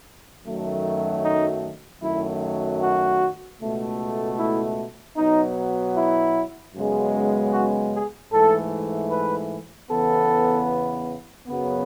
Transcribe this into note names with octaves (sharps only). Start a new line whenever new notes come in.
F#2 D#3 F#3 A3
D#4
F#2 D#3 F#3 A3 E4
F#4
C#2 B2 A3
E4
B2 F#3 B3 D#4
E4
F#2 C#3 G#3 B3
F#4
G#4
G#2 E3 A3 A4
B4
E2 C#3 E3 B3 A4
F#2 C#3 F#3 B3